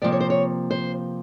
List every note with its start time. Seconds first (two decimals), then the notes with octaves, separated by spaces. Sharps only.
0.02 C3 F3 A#3 D5
0.12 C#5
0.20 C5
0.30 C#5
0.71 C5